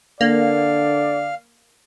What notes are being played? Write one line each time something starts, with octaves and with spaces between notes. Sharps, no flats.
D3 A#3 D5 F5